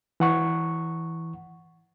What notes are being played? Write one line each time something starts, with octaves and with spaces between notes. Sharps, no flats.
E3 F#5 C#6